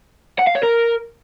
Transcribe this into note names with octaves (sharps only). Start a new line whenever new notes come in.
F#5
F5
C#5
A#4